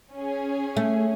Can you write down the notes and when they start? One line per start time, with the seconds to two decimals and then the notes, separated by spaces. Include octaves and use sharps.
0.12 C#4 G#4
0.77 A3